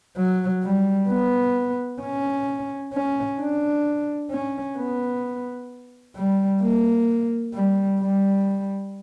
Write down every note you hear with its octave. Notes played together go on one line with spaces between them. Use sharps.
F#3
G3
B3
C#4
C#4
D4
C#4
B3
G3
A#3
G3
G3